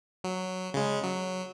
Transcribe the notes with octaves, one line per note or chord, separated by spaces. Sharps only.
F#3
C#3 G#3
F#3